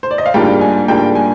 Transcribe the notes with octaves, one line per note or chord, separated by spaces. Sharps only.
C5
D5
D#5
F5
G#2 G3 A#3 D4 F4 G5
G#5
G#2 G3 A#3 D4 F4 G5
G#5